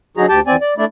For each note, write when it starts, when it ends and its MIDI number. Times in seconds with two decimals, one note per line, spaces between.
0.17 0.26 50
0.17 0.26 54
0.17 0.26 63
0.17 0.26 66
0.17 0.26 68
0.17 0.26 82
0.29 0.40 38
0.29 0.40 67
0.29 0.40 79
0.29 0.40 81
0.47 0.56 40
0.47 0.56 60
0.47 0.56 74
0.47 0.56 80
0.61 0.74 74
0.78 0.85 57
0.78 0.85 62
0.78 0.85 64
0.78 0.85 74